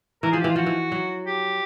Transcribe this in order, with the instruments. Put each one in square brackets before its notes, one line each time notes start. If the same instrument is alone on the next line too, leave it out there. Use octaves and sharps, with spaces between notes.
[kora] E3 [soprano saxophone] A#4
[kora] F3 [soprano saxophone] G#4
[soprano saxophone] G4
[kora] E3 [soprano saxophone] F4
[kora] F3 [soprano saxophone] F#4
[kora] E3
F#3
[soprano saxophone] G4